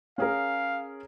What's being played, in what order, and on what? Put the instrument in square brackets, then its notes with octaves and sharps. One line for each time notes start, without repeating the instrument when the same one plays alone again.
[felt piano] C#4 G#4 A#4 [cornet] F5